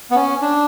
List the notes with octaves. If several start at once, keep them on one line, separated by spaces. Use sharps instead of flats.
B3
C#4
D4